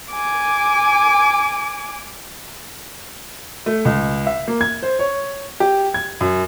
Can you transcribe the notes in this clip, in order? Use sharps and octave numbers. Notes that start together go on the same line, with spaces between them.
G#5 D6
A3
C#2
E5
A#3
G#6
C5
C#5
G4
G#6
F#2